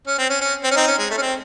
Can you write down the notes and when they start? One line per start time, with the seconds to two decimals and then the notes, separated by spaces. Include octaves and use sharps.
0.07 C#4
0.18 C4
0.29 C#4
0.41 C#4
0.64 C4
0.71 C#4
0.76 C4 D#4
0.87 C#4
0.98 G#3
1.10 A3
1.18 C#4
1.21 C4